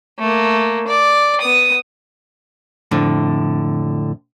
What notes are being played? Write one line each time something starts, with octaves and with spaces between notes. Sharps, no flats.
A3 A#3
D5
B3 D#6
F2 A2 D3